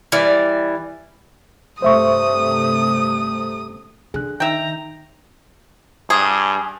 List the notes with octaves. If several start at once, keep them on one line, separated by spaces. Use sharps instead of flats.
E3 G3 D5
G2 C3 A3 C5 E5 C#6 D#6
D3 G#4 F#6
D#3 D#4 E5 G5 A#5
G2 G#4